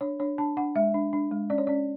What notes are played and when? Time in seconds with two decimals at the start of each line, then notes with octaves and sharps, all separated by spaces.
0.01 D4 C#5
0.20 D4 C#5
0.38 D4 A5
0.57 D4 F#5
0.75 G#3 E5
0.94 D4
1.13 D4
1.32 G#3
1.50 C#4 D5
1.58 C#5
1.67 C#4 D5